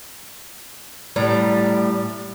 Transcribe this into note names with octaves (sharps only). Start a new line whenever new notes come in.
A2 G3 D5 A#5